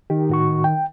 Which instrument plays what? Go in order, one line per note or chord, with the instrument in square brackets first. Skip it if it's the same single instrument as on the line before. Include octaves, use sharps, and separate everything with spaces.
[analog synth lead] D#3 [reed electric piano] G4
[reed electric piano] A2 F#4 C#6
G5